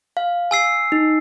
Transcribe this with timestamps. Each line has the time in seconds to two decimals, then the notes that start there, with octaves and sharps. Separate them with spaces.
0.17 F5
0.51 G#5 E6 C7
0.92 D#4